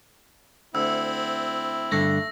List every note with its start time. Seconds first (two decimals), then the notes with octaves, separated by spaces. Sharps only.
0.75 D2 C4 E4 E6
1.92 G2 D3 A3 A#6